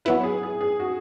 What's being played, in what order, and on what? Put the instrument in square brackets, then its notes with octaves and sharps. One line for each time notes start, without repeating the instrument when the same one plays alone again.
[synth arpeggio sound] F#3 B3 E4 [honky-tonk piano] B4
[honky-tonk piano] G#4
G#4
G#4
F#4